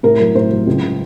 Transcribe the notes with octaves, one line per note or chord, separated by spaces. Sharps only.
A2 A#4
F#3 A#4
A2 C5
F#3
C#2
C#3